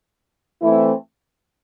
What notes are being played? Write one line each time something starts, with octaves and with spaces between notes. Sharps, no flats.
E3 A3 C4 E4